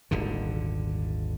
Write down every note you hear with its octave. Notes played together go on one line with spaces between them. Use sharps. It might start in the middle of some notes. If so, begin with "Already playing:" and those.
D#1 G#1 D3